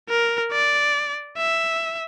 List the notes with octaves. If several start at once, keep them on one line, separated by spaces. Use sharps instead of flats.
A#4
D5
E5